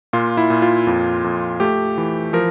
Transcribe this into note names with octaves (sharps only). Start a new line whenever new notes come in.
A#2 F4
E4
A#2
F4
F2
F2
A3 G4
E3
F3 A#4